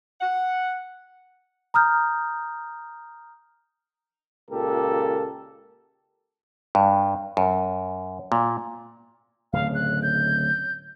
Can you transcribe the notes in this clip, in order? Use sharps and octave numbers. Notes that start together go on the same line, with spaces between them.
F#5
A#5 D#6 F6 G6
C#2 A#2 G4 A4 A#4
G2
F#2
A#2
D1 C#3 F5
F#6
G6